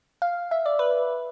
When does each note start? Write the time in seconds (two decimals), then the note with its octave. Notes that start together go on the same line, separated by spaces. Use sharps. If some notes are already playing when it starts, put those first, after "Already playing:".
0.22 F5
0.51 E5
0.66 D5
0.79 B4